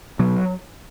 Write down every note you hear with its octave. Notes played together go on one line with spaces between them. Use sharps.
B2 F#3